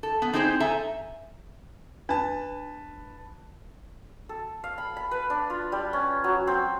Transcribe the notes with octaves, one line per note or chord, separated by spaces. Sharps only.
A4
B3
C4 D#4 E4 G#4 A4 C5
A4 E5 G#5 A#5
D4 B4 A5
A4
F5
B5
B5
B4
D4
F4
G3
C#4
F#3
C4